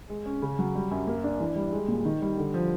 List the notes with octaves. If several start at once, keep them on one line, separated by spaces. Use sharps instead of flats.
G#3
C#4
C#3
F#3
G3
F#2
A#3
D4
E3
G3
G#3
A#2
D#3
G3
D3
F3